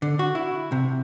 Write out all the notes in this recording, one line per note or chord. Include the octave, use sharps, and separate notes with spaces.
D3
F#4
E4
C3